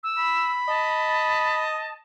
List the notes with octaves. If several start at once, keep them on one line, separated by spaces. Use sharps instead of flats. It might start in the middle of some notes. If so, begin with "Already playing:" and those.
E6
B5
D#5 A5